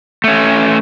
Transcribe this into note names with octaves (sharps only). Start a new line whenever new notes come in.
A3 C#4